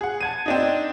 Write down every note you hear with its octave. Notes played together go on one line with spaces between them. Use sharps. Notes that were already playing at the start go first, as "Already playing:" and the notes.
G#4 F#5
A5 G#6 D#7
C4 D4 D#4